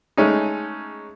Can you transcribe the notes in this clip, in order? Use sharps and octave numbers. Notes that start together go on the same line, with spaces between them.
G#3 A3 C#4 D#4